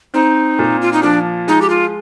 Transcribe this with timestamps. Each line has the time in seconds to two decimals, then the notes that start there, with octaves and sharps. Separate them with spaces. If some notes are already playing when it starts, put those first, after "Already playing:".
0.14 C4 D#4
0.59 A#2
0.82 F4
0.93 D#4
1.03 F3 D4
1.47 G#3 D#4
1.62 G4
1.69 F4